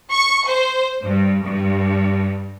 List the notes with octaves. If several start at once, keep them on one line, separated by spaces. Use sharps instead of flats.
C#6
C5
G2
G2